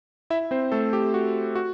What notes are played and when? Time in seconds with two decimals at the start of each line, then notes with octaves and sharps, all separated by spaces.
0.30 E4 E5
0.51 C4 C5
0.72 A3 A4
0.93 G4
1.14 F#4
1.55 F#4